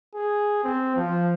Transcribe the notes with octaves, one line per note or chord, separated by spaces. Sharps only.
G#4
C4
F3